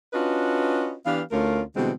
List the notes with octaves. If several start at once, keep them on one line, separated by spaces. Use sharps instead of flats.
C#4 D4 F4 F#4 B4 D#5
E3 B3 D4 G4 F5
D2 A3 C#4 F4 A#4 F5
B2 D3 E3 G3 G#3 C4